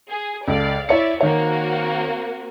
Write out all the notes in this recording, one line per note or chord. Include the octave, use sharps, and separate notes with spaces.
G#4
C#2 A4 D5 F5
E4 C#5 D5 E5 C#7
D#3 A#3 C4 F#4 C#5